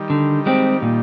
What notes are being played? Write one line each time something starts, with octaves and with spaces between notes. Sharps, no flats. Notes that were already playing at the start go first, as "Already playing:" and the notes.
Already playing: D#3 G3
D3
G#3 C4 G4
A#2